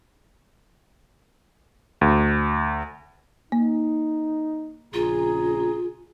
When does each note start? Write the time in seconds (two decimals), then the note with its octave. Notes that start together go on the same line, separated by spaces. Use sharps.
2.01 D2
3.52 A#3 D#4
4.93 A#1 C#3 F4 G#4 A#5